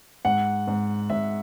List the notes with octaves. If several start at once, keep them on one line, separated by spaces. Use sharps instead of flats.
G#2 F#5
G#2
G#2 E5